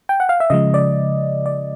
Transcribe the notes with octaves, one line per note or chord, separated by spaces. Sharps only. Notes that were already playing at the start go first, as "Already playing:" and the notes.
G5
F#5
F5
E5
C#3 F3 G#3 D#5
D5
D5